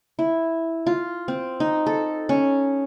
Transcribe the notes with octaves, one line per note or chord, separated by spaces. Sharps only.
E4
F4
C4
D#4
A4
C#4